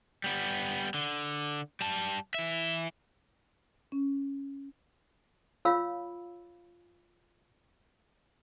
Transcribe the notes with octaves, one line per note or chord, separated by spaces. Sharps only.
G3 B3
D3
G3 A5
E3 E5
C#4
F4 C#5 F5 B5 E6